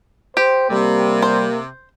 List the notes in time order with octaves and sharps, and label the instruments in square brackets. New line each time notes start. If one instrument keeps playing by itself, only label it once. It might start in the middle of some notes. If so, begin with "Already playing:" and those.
[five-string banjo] G4 [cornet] C5
[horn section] C3 [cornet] G3 [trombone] A#3
[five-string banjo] C5